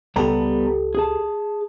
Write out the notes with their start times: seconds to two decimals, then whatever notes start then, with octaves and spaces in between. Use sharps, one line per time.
0.16 C#2 G3 B3 G4 A4 A#5
0.95 G#4 A5